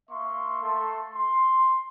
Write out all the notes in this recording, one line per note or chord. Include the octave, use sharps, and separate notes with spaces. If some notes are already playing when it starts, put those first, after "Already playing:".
A#3 E5 C6 C#6
A3 A4 C6
C6